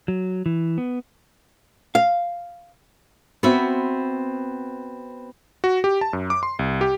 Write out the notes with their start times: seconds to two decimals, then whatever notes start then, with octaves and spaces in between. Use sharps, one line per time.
0.08 F#3
0.46 E3
0.78 B3
1.95 F5
3.43 B3 C4 F#4 C5 E5
5.64 F#4
5.84 G4
6.01 A5
6.13 F#2
6.30 D6
6.43 C6
6.59 C2
6.81 G4